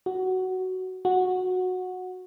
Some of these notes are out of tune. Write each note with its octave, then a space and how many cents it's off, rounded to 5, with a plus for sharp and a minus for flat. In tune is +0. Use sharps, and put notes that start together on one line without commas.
F#4 +10
F#4 -10